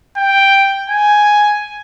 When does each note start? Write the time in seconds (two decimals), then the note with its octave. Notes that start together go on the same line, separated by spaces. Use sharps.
0.17 G5
0.90 G#5